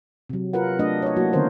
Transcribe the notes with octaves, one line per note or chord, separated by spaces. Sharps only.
C3 F#3
F4 A#4 B4 F#5
A3 D4 D#5
C#5 D#5
F#3 A#3 E4 F#4
D3 D#3 B3 C#4 A#4 C5